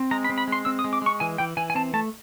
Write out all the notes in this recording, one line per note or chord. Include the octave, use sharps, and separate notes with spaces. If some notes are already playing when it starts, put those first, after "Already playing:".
Already playing: C4
G#3 A#5
B5
C4
B5
G#3 C6
C4 E6
D#6
G#3
D6
G#3 C#6
E3 G#5
E3 G5
E3 G#5
G#5
C4 A5
A3 A5